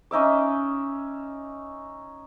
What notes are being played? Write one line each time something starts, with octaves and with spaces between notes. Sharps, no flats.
C#4 D#4 E5 D6